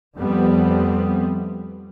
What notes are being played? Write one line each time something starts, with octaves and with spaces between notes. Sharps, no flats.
F2 G3 A3 B3 C4